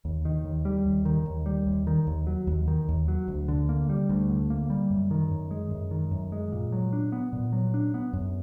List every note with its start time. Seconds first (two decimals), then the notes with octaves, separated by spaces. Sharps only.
0.05 D#2
0.25 D#3
0.45 D#2
0.65 G3
0.86 D#2
1.05 D#3
1.26 D#2
1.46 G3
1.67 D#2
1.87 D#3
2.07 D#2
2.27 F#3
2.47 D#2
2.68 D#3
2.89 D#2
3.08 F#3
3.28 D2
3.48 D3
3.69 A#3
3.89 G3
4.09 D2
4.29 D3
4.50 A#3
4.70 G3
4.91 F#2
5.11 D#3
5.31 F#2
5.51 G#3
5.71 F#2
5.91 D#3
6.11 F#2
6.32 G#3
6.52 A#2
6.72 F#3
6.93 D4
7.12 B3
7.33 A#2
7.53 F#3
7.74 D4
7.94 B3
8.13 F#2